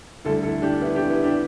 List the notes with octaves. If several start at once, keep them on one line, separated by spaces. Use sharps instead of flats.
D2 D3 G3 E4 A4
E4 A4
D4 G4
B3 E4
D4 G4
B3 E4
D4 G4